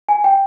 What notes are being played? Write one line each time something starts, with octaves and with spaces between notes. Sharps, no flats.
G#5
G5